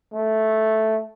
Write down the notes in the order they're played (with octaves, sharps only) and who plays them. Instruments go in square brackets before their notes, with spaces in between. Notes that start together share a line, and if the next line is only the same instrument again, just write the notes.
[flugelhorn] A3